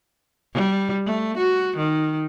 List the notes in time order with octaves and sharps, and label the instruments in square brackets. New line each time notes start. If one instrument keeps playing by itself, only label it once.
[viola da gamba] G3
A3
F#4
D#3